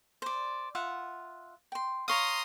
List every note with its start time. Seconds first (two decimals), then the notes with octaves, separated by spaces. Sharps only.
0.22 C5 D5
0.75 F4 E5 F#5
1.72 G5 C6
2.08 C#5 F5 A#5 C6 D#6